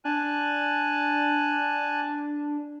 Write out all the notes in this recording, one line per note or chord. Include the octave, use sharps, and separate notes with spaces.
D4 G#5 A5 F#6